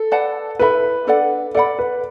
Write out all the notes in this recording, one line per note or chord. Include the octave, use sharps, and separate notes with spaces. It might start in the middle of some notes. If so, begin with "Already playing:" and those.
Already playing: A4
B4 D5 F#5 A5
E4 A4 B4 E5 B5
D4 A4 D5 F#5
A4 D5 F#5 B5
B4